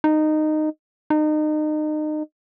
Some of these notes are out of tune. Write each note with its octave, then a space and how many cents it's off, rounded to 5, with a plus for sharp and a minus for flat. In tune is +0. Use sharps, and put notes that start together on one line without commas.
D#4 -15
D#4 -30